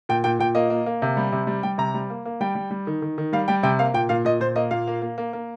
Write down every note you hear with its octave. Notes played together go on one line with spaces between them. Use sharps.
A#2 G5
A#2 G5
A#2 G5
A#3 D#5
A#3
A#3
C3
G3
C3
G3
G3 G5
C3 A#5
G3
A#3
A#3
G3 G5
G3
G3
D#3
D#3
D#3
G3 F5
G3 G5
C3 G5
A#3 F5
A#2 G5
A#2 F5
A#2 D#5
A#2 C5
A#3 D#5
A#2 F5
A#3
A#3
A#3
A#3